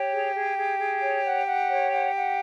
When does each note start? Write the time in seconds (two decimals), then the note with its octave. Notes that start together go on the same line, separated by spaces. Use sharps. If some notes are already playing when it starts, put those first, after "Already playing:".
Already playing: G4 C#5
0.12 G#4
0.34 G#4
0.57 G#4
0.79 G#4
1.01 C#5
1.24 F#5
1.46 F#5
1.69 C#5
1.91 F#5
2.14 F#5